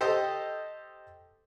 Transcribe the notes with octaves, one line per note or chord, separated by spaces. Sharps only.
G4 A4 C5 D#5